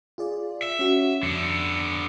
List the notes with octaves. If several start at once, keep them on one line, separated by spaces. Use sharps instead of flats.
F4 G#4 D5
E5
C#4 F#4
F2 D3 B3